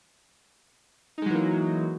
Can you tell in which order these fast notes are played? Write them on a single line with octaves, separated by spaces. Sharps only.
D#4 G#3 F#3 E3 A#3